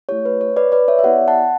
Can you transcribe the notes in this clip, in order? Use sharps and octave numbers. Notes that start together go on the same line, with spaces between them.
A3 E4 G4 C#5
B4
C#5
B4 D5
B4 D5
C#5 E5
E5
B3 E4 G4 D5 F#5
F#5 A5